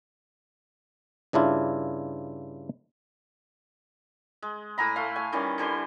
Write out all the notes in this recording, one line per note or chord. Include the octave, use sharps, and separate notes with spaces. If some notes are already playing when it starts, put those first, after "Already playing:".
G2 C#3 D4 E4 F4
G#3
A2 G#5 A#5 B5
A3 F5
G#5 C#6
D#3 E3 G3 C#4
D3 E3 G3 C6